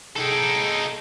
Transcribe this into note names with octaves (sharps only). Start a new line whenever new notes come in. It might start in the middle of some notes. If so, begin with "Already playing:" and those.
D#4 G#4 A4 G5